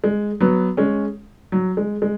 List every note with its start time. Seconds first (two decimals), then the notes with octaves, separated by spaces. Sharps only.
0.04 G#3
0.40 F#3 B3
0.77 G#3 C#4
1.52 F#3
1.77 G#3
2.02 G#3